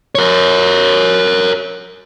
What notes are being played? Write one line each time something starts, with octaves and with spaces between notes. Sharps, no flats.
A#4 C#5